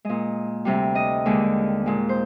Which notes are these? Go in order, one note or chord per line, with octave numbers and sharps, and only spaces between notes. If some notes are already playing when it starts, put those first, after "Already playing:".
A#2 G#3 D#5
D2 C3 G3
D#5
D#2 D3 G#3
A#2 G#3
C5